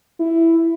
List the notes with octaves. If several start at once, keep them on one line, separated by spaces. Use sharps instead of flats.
E4